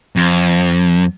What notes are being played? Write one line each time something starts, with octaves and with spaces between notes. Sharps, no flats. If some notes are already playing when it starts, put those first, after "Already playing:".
F2